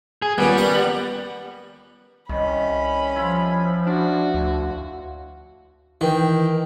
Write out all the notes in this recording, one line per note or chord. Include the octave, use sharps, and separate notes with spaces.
G#4
D#2 A#2 C#3 G3 B3
F#5 A#5 C#6
C2 D#3 C#4 B5
F3 E4 F4
D4 F#4
D2
D#3 E3 G5